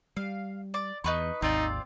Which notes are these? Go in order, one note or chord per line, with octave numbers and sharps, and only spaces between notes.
G3 F5
D5 D6
E2 D#4 B4 C#6
G#1 D#2 C4 D#4 F4 D5